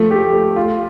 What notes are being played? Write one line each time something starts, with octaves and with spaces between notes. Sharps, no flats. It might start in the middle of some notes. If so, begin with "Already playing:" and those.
Already playing: F3 A3
G4
A3
F4